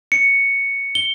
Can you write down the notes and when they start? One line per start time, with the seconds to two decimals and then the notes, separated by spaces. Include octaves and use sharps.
0.12 C#7
0.95 G7